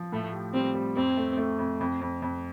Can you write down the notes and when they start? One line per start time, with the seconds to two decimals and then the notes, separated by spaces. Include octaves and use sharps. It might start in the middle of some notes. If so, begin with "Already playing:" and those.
Already playing: F3
0.12 A2 A3
0.33 G4
0.54 G3 C4
0.74 G3
0.96 F2 C4
1.17 A3
1.37 A3
1.58 F2
1.81 F2
2.01 F2
2.22 F2